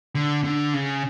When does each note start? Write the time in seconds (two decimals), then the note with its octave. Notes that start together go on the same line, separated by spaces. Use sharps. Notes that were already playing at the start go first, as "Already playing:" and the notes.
0.15 D3
0.44 D3
0.74 C#3